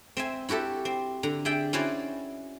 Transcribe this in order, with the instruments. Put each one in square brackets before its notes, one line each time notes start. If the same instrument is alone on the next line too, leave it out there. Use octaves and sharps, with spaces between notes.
[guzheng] C4 E5 G#5
E4 F#4 G4 A4 E5
C4
D3 A#5
G#4 D5 E5 G5
C#4 E4 F#4 C5 D5 G#5